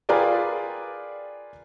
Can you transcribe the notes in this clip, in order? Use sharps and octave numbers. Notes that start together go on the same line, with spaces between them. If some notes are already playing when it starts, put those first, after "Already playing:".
F4 G#4 A#4 B4 D5 G5